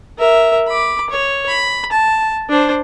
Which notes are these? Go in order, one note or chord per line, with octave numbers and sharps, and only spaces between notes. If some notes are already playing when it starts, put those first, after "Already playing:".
A#4 E5
B5 D6
C#5
B5
A5
D4 C5